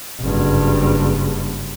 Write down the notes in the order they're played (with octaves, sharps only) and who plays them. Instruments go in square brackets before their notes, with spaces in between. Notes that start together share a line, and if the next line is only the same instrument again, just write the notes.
[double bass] F#1 G2